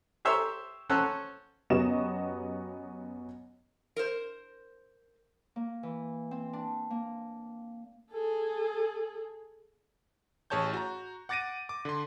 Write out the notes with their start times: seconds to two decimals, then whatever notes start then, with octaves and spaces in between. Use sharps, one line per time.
0.25 G4 C5 C#5 E5 C6 E6
0.90 C#4 A4 C5 F#5 E6 F#6
1.70 F#2 B3 F#4 G4 D#5 E7
3.96 A#4 C5
5.56 A#3
5.83 E3
6.31 C4
6.53 D4
6.90 A#3
8.11 G#4 A4
10.50 A1 G#4 C#5 A5 G6
10.74 F#4 A#5
11.29 F#5 D6 A6 A#6 D7 D#7
11.69 D6
11.85 D3 C6